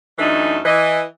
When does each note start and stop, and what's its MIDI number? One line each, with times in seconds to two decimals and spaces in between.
0.19 0.59 42
0.19 0.59 52
0.19 0.59 57
0.19 0.59 62
0.19 0.59 63
0.65 1.01 52
0.65 1.01 75